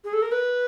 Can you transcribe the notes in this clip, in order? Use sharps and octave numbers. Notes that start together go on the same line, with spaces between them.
G#4
A4
A#4
B4